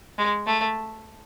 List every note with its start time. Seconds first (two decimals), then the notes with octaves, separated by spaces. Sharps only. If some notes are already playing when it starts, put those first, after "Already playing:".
0.18 G#3
0.46 A3